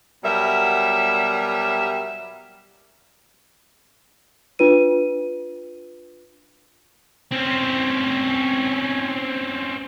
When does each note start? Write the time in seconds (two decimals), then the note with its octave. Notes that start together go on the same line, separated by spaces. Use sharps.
0.24 B2 F#3 G3 A#4 E5
4.59 D4 F4 B4 D#7
7.31 C4 C#4